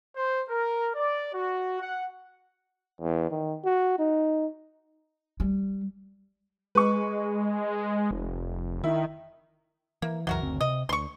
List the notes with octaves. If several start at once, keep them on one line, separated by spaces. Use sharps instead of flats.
C5
A#4
D5
F#4
F#5
E2
D#3
F#4
D#4
G3
G#3 B4 C#6
F1
D#3 E4
E3 A#3
C#2 F#2 E3 F#3 F#4 A#4
F#1 D2 C4
C3 D#5
D2 C6 C#6